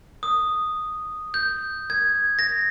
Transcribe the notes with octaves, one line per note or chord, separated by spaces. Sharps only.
D#6
G6
G#6
A#6